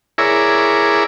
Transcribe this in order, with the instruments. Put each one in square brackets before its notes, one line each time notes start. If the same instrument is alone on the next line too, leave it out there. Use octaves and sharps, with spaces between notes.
[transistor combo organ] E4 G#4 A#4 C#5 D5 E5